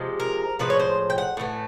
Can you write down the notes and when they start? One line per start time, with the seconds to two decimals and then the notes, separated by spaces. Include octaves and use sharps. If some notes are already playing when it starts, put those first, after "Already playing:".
Already playing: C3 F3 G#3
0.20 A#4
0.59 A2 F3 G#3 B4
0.70 C#5
0.80 C5
1.10 G5
1.18 F#5
1.37 A2 E3 A3